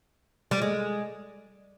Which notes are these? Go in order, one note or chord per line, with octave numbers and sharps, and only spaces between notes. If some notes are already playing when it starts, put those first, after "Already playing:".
G3
G#3